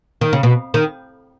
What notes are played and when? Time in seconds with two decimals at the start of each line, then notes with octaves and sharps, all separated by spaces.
0.21 D#3
0.33 C#3
0.43 B2
0.74 D#3